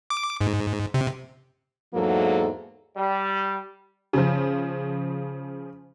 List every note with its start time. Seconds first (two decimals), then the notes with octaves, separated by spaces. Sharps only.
0.10 D6
0.41 G#2
0.94 C3
1.94 E2 G#2 F#3 A#3 A4
2.97 G3
4.13 C#3 F3